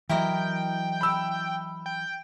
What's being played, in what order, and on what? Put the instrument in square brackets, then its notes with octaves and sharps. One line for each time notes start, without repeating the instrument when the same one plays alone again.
[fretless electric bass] E3 F#3 [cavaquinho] E4 A#4 D#5 [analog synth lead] G5
[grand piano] B5 E6
[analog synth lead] G5